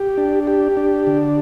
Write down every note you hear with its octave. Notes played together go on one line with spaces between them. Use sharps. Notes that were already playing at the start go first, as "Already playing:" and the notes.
Already playing: G4
D4
G4
D4
D3